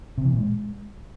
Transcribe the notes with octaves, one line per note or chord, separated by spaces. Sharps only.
C3
E3
A#2
G#3